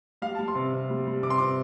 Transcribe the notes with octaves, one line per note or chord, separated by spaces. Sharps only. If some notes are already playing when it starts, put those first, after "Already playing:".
G3 F5
G3 A5
C6
C3
C3
G3
G3
C3 D6
C6
C3 D6